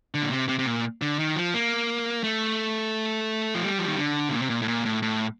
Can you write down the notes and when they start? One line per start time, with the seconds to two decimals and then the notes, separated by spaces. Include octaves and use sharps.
0.14 D3
0.22 A#2
0.31 C3
0.49 C3
0.59 C3
0.66 A#2
1.02 D3
1.19 D#3
1.36 F3
1.54 A#3
2.24 A3
3.54 F3
3.63 G3
3.78 F3
3.88 D#3
3.98 D3
4.28 C3
4.33 A#2
4.42 C3
4.50 A#2
4.62 A2
4.68 A#2
4.85 A2
5.02 A2